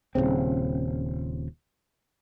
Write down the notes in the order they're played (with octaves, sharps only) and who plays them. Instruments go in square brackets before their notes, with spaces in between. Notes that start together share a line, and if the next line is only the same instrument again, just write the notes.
[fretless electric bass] D#1 A#1 C#3 C4